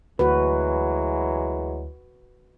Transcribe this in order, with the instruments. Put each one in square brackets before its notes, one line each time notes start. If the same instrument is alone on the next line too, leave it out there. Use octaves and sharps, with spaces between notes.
[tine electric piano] D2 [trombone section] E3 F#3 G#3 [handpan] F#4 B4